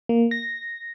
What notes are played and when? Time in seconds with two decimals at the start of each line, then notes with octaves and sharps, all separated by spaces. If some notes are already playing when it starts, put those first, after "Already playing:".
0.09 A#3
0.31 A#6